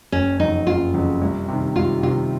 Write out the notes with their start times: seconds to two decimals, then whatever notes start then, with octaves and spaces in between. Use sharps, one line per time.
0.12 F#1 C#4
0.39 F2 C#3 F#3 D#4
0.67 F#1 F4
0.94 F2 C#3 F#3
1.22 C2
1.48 C3 D#3
1.76 C2 F4
2.03 C3 D#3 F4